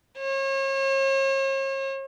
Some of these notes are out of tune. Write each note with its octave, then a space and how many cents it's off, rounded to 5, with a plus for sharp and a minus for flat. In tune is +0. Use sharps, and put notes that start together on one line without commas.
C#5 -40